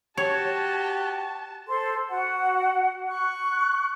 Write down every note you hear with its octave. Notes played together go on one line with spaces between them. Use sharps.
F#4 G4 C#5 A5
A4 C5 C6
F#4 F#5
C#6 F#6